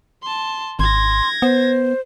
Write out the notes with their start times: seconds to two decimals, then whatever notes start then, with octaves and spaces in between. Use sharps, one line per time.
0.23 A5 C6
0.79 G#1 C6 G#6 A#6
1.42 B3 C5